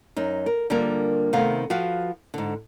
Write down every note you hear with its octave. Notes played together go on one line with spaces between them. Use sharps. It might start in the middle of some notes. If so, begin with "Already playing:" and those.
F#2 D#4
A#4
D3 G3 A#3 D4 F4 A#4
C3 D#3 A3 B3 F5
F3 F#4 B4 F5
G#2 D3